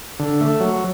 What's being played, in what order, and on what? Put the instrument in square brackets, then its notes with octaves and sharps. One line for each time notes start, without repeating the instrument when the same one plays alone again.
[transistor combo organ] D3
A3
F#3